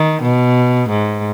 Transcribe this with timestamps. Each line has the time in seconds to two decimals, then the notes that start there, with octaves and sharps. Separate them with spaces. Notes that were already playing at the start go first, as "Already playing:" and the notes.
Already playing: D#3
0.23 B2
0.90 G#2